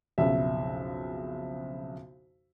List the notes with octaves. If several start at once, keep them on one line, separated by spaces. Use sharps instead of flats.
B1 F2 C#3 E5